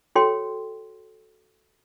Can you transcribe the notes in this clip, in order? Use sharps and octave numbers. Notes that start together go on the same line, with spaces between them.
F#4 A4 C#5 G5 C6